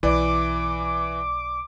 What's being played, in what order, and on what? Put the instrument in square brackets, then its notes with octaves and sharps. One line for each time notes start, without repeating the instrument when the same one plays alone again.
[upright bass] B1 F4 [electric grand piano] E3 [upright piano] D5 [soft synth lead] D6